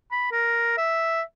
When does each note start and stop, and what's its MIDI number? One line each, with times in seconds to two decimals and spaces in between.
0.12 0.29 83
0.32 0.73 70
0.78 1.22 76